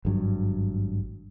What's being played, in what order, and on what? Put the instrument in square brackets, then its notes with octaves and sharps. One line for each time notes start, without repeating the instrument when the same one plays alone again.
[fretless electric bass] G#1 G2 F#3